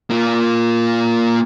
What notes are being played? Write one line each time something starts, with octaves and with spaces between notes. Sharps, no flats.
A#3 F4